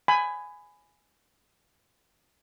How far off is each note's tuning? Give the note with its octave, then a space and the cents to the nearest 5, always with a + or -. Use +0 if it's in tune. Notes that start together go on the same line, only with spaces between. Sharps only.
G#5 +0 B5 +20